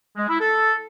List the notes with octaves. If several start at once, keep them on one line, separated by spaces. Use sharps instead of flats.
G#3
E4
A4